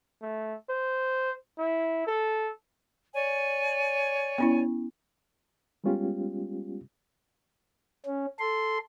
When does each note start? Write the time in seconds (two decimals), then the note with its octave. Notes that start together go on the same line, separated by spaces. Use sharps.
0.22 A3
0.69 C5
1.58 E4
2.07 A4
3.14 C#5 D5 G#5
4.38 B3 C#4 E4
5.84 G3 G#3 B3 C#4 F4 G4
8.06 C#4
8.39 A4 C6